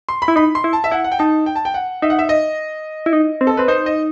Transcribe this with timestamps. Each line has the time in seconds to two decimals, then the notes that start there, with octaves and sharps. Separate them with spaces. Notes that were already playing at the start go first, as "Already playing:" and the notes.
0.09 C6
0.22 B5
0.28 E4
0.36 D#4 B5
0.55 C6
0.64 E4
0.73 A5
0.84 E5
0.91 E4 F#5
1.04 F#5
1.12 G5
1.19 D#4 A5
1.46 G5
1.55 A5
1.65 G5
1.74 F#5
2.02 D#4 E5
2.10 F#5
2.19 E5
2.29 D#5
3.06 E4
3.13 D#4
3.41 C4
3.47 A4
3.57 C4 B4
3.68 D#4 C5
3.86 D#5